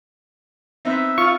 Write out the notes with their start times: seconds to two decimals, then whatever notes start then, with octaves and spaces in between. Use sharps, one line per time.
0.85 B3 C4 D#4 E5
1.18 F4 C#6